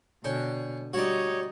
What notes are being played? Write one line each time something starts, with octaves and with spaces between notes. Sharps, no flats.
B2 D3 C#4 G5
G3 D#4 F#4 C#5 D5